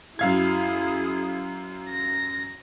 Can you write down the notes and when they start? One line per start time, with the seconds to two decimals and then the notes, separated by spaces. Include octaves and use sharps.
0.19 F#2 E4 G#4 F5 G#6
1.89 A#6